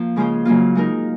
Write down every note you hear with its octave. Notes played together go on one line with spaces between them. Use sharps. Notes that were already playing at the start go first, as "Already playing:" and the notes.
Already playing: F3 A#3
C#3 G#3 C#4 F4 C5
C#3 F#3 A#3 F4
G#3 D#4 A#4